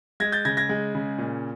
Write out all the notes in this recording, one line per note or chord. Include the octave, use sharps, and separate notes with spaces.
G#3 G#6 A#6
G6 A6
C#3 G#6 A#6
G#6 A#6
G#3
C#3
A#2